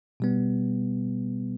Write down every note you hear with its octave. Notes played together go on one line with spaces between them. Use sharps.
B2 G3 B3